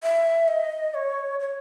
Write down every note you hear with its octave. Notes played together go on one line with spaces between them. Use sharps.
E5
D#5
C#5
C#5